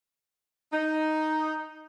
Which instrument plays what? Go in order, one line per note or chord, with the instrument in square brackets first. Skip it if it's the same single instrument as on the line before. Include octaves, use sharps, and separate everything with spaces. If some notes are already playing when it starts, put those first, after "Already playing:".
[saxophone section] D#4